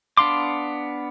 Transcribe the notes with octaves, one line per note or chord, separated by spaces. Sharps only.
B3 D4 F5 C6 D6